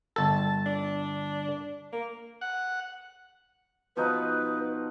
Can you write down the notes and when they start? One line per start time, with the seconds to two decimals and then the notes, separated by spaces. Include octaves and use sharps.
0.16 G1 A4 A5
0.67 D4
1.93 A#3
2.41 F#5
3.97 B2 F3 D#4 B4